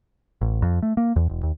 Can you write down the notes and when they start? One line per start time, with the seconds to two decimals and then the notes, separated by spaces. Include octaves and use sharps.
0.41 A1
0.62 F2
0.82 A3
0.97 A#3
1.16 E2
1.30 E1
1.43 D#2